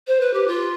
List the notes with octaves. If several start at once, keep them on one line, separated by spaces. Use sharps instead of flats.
C5
B4
G4
F4